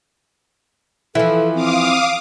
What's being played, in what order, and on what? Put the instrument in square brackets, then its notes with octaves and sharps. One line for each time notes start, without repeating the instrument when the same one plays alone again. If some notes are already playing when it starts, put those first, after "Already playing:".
[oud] E3 F3 [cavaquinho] E4 [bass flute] A4
[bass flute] C4 [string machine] F5 D6 D#6